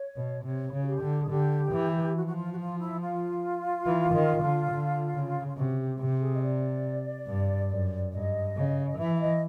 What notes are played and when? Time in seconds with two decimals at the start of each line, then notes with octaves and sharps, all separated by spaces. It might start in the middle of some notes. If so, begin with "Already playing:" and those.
Already playing: C#5
0.16 B2
0.44 C3 C#5
0.73 C#3
0.83 F#4
0.87 G4
1.01 D3
1.22 G#4
1.30 D3 G4
1.72 E3
2.15 F3 F#4
2.26 F#4
2.36 F4
2.52 F#4
2.58 F4
2.79 E4
3.01 F4
3.86 E3
4.14 D#3
4.43 D3
4.71 D3
5.15 C#3
5.47 F4
5.57 C3 F#4
5.79 G4
5.99 C3 G4
6.20 G#4
6.34 D#5
6.42 D5
7.27 G2
7.70 F#2
8.12 G2 D#5
8.56 C#3
8.87 D#5
8.98 E3 E5
9.15 E5
9.20 D#5